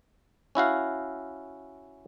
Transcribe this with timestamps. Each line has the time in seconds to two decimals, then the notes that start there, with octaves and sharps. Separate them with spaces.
0.55 C#4 E4 F#4 F5